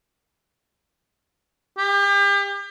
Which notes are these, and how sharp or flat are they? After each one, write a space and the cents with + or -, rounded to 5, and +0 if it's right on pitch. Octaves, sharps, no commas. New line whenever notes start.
G4 +35